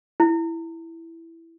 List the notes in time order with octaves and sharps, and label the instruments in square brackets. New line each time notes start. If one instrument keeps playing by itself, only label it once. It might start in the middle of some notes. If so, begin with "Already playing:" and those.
[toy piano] E4